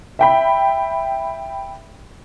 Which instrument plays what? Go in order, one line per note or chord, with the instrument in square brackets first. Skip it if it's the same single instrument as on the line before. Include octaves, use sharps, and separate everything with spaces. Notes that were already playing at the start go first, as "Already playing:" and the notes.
[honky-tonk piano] E5 G5 B5